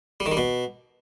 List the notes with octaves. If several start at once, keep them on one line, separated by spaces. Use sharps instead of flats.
G3
D#3
G3
B2